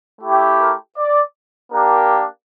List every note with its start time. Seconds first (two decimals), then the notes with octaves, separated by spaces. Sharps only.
0.21 A3 E4 G4
0.60 A#4
0.98 D5
1.73 A#3 D4 G4 A#4